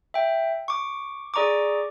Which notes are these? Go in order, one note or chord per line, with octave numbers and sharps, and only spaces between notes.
E5 G5
C#6 D6
G#4 D5 A#5 C#6 D6